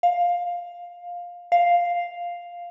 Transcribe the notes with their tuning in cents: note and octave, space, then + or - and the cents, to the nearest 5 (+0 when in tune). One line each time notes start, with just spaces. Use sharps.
F5 +10
F5 +0